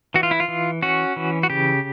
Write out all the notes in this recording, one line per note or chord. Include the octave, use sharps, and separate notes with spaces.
E3 F#4
F4
E4
F4
E3
C#4 F#4
E3
F#4
C#3 G4